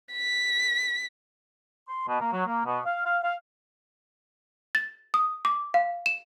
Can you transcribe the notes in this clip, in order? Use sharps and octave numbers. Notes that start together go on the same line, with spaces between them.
B6
C6
B2
A#3
F#3
A#3
B2
F5
F5
F5
A6
D#6
D6
F5
E7